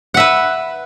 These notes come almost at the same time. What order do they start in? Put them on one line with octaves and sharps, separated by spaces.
F#5 E5 B4